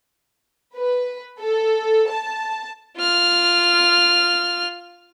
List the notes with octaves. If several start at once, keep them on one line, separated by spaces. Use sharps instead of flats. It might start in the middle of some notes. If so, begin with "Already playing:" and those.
B4
A4
A5
F4 F6